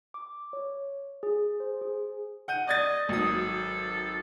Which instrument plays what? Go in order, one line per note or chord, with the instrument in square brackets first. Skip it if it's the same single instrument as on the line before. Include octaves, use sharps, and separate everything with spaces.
[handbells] D6
C#5
G#4
C5
G#4
[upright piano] F#5 G6 D#7
[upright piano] D5 G#6 A6 [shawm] D#5
[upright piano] G#1 F#3 D#6 [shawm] A4